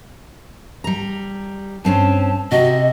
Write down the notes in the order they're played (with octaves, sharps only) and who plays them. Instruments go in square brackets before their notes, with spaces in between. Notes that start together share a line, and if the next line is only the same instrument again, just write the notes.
[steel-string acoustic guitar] G3 A#5
[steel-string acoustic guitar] G2 C4 C#4 [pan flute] A5
[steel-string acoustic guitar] C3 F#4 [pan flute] D#5